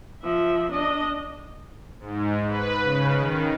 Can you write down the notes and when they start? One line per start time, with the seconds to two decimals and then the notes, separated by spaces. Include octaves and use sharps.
0.22 F3 E5
0.72 D4 D#5
2.00 G#2
2.48 B4
2.83 C#3
3.17 D#3